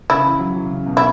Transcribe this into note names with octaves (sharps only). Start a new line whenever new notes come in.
C#3 E4
E3
F#3
E3
C#3
B2
E4